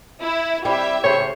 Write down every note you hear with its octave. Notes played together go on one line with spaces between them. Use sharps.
E4
G3 C4 E4 G4 E5
A2 C#3 C5 C#5